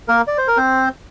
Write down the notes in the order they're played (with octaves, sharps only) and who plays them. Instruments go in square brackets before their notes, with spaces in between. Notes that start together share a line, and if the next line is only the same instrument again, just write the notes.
[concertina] A#3 A#4
D5
C5
A#4
C4 C5